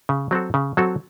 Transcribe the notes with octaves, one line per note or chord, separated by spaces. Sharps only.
C#3
F#3 C4 F#4 A4
C#3
F#3 C4 F#4 A4